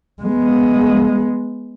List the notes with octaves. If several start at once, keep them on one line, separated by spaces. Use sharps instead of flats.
G#3 B3